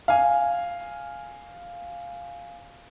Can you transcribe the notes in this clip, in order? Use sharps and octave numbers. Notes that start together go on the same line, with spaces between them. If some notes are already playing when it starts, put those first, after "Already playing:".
F5 G#5